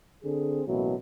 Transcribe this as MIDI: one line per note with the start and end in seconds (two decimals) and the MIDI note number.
0.24 0.62 50
0.24 0.62 60
0.24 0.62 68
0.67 0.94 33
0.67 0.94 47
0.67 0.94 54
0.67 0.94 58
0.67 0.94 64